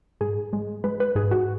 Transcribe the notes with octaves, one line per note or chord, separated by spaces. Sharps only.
G#2 G#4
G#3
G#3 B4
B4
G#2 G#4
F#4